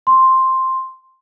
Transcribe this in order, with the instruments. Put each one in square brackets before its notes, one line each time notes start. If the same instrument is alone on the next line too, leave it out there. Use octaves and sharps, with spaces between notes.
[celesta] C6